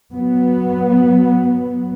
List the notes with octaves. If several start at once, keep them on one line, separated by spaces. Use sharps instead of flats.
F#3 B3